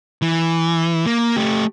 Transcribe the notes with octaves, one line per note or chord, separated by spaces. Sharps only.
E3
A#3
A3 G4